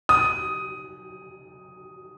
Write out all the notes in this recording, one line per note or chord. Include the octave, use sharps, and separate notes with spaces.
D#6